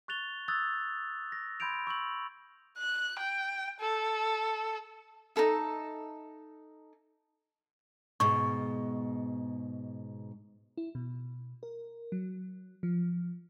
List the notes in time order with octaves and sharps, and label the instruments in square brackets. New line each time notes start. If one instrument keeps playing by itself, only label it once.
[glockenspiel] C#6 F#6 A6 F7 G7
C#6 D#6 E6 F#6 G#6 A6
A#6
B5 C6 G6 G#6 D7 F7
C#6 E6 G6 F#7
[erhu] F#6
G5
A4
[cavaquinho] D#4 G#4 A4 E5
[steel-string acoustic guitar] G#2 B2 [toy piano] C#6
[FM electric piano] E4
B2
A#4
F#3
F3